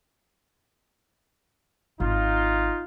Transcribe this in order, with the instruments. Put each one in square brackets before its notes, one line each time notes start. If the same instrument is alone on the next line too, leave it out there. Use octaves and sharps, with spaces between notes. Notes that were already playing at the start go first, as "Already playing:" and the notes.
[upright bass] G#1 [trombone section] D#4 F4